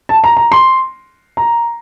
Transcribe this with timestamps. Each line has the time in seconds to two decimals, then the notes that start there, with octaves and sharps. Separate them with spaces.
0.09 A5
0.24 A#5
0.37 A#5
0.52 C6
1.37 A#5